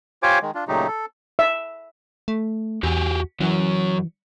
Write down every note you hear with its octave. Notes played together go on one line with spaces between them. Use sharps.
F4 G4 C5 C#5 G#5 D6
D#3 G#3
D4 F4
A#2 C#3 F#3 A3 D#4 G4
A4
E5
A3
E2 F#4 G4 G#5
F#2 E3 F#3 C#4